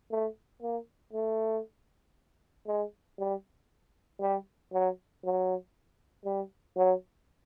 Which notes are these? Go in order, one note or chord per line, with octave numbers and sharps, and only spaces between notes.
A3
A#3
A3
G#3
G3
G3
F#3
F#3
G3
F#3